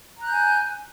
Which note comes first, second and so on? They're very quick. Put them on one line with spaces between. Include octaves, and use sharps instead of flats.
A#5 F#6 G6 G#5